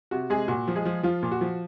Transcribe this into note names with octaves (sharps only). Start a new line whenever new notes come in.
C3 F#4
C3 G#3 G#4
A#2 F#4
F3
G#3 G#4
F3
F3 F4
A#2
F#4
F3